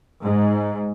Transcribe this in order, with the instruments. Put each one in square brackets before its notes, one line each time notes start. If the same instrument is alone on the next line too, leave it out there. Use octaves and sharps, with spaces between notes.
[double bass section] G#2